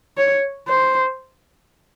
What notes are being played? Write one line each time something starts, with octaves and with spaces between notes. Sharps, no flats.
C#5
C5